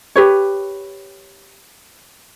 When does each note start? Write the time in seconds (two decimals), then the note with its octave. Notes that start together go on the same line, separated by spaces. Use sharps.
0.16 G4 B4 C#5